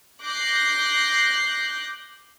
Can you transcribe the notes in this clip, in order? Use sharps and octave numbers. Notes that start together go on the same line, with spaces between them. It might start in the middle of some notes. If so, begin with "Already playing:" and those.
D6 F#6 G6 A#6 C7